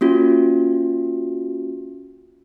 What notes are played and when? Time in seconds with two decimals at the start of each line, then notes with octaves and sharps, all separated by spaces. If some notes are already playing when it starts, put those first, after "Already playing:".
0.01 A#3 C#4 F4 F#4